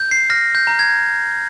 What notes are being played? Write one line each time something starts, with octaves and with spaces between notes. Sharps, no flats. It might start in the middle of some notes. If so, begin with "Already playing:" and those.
Already playing: G6
C7
F6 A#6
G6
A#5
G#6